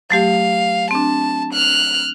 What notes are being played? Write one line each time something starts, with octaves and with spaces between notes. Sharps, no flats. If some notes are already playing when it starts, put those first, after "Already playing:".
F#3 A3 G4 F5
C4 D4 A5
F6 F#6